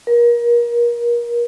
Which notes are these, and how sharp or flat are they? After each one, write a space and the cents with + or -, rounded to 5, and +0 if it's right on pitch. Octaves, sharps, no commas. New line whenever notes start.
A#4 +30